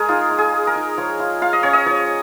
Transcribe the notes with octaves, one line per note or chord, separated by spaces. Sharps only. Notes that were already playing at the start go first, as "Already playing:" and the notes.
Already playing: G#3 G#4 A#4
D#4 F4
D#4
G#4
G#3
A#4
D#4
F3 C#5
F4
F4 F5
D#5
C#4 C#5
D#5
F3 C#5